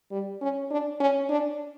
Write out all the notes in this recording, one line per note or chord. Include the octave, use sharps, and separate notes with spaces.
G3
C#4
D4
C#4
D4